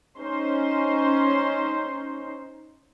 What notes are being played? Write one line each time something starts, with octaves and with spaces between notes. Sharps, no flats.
C#4 D#4 C5 C6